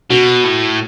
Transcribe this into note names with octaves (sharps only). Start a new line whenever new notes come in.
B2 F#4
A2